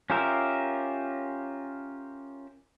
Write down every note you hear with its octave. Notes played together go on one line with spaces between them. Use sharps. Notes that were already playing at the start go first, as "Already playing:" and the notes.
C#4 F4 G4 A#4 E5